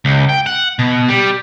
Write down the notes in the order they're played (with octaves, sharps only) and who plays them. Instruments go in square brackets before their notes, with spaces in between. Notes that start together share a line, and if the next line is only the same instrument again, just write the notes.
[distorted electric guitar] C#2
G5
F#5
B2
G3